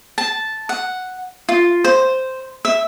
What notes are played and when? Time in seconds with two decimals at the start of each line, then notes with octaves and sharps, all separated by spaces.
0.18 A5
0.69 F#5
1.49 F4
1.84 C5
2.65 E5